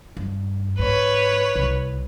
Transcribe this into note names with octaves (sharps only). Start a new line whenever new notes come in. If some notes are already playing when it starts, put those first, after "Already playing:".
G2
G#2 B4 C#5
C2